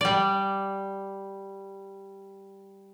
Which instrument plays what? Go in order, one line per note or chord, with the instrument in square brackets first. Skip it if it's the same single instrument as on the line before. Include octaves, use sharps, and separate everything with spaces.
[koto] G3 D5